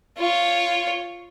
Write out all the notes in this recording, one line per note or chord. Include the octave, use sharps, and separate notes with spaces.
F4 C#5